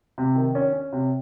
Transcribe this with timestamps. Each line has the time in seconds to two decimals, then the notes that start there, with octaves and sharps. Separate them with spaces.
0.18 C3
0.35 D#3
0.55 C#4
0.73 C#4
0.93 C3